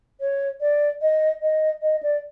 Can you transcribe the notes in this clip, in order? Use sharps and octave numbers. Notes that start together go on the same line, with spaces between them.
C#5
D5
D#5
D#5
D#5
D5